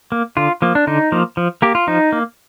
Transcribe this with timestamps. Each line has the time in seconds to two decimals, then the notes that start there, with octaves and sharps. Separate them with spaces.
0.12 A#3
0.37 D3 F4
0.62 F3 A#3
0.75 D4
0.87 D3 D#4
1.12 F3 A#3
1.37 F3
1.62 A#3 G4
1.75 F4
1.87 F3 D#4
2.12 A#3